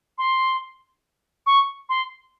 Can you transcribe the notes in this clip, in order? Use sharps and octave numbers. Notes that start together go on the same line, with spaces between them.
C6
C#6
C6